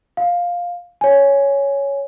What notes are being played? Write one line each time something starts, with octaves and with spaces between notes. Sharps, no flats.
F5
C#5 G#5